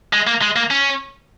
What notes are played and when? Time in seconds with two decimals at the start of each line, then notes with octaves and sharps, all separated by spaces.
0.13 G#3
0.27 A#3
0.42 G#3
0.56 A#3
0.71 C#4